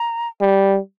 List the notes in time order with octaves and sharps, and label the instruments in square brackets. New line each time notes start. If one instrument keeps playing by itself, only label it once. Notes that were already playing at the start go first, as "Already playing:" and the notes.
Already playing: [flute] A#5
[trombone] G3